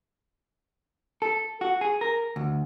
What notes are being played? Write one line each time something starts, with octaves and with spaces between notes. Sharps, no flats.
A4
F#4
G#4
A#4
D2